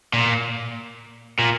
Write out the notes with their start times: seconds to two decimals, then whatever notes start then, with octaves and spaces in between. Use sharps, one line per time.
0.14 A#2
1.39 A#2